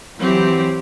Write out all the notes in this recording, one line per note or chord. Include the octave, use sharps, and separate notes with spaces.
E3 F#3 C4 G4